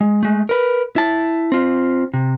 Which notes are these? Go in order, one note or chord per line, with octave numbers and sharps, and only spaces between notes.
G#3
G#3 A3
A#4 B4
E4 A5
C4 F4
C3